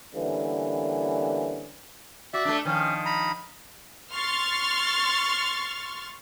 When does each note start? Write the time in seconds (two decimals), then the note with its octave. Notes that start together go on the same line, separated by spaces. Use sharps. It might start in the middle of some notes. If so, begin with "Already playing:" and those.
0.15 D3 E3 G3 A#3 B3 C#4
2.33 F#4 D5 E5
2.45 A3 D4
2.65 D#3 F3 C#4
3.06 A#5 B5
4.13 C6 C#6 F6 A6